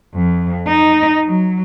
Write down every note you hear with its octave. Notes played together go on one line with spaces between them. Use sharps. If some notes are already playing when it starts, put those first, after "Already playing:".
F2
D#4
F#3